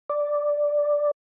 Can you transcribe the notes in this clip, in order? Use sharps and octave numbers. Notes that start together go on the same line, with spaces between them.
D5